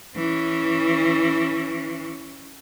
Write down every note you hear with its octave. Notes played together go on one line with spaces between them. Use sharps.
E3 C#4